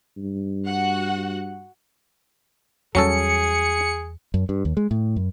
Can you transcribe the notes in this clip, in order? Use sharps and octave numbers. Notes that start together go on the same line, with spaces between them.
G2
F#4 F#5
E2 F#3 G3 C#4 G#4 A4 C#7
F#2
G2
D#2
G#3
A2
F#2